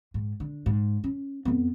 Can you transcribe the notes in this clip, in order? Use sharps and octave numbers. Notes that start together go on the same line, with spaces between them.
G#2
D3
G#2
C#4
F2 B3